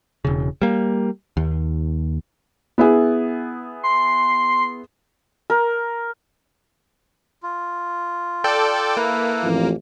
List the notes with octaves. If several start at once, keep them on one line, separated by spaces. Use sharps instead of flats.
E1 C#3
G3 A#3
D#2
B3 E4 G#4
C6
A#4
F4
A4 D5 G5
A#3 E4 A4 B4
A1 F2 F4